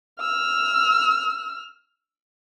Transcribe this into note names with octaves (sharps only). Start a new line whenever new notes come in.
E6 F6